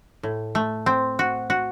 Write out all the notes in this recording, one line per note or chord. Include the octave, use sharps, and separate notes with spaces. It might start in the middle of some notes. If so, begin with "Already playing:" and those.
A2
A3
C4
F#4
F#4